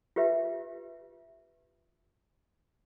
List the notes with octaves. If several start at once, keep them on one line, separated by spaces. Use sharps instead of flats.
F4 G4 B4 E5